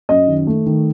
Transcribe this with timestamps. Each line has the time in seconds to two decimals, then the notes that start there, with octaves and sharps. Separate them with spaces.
0.09 F#2 D#5
0.27 D#3
0.47 A3
0.66 D#3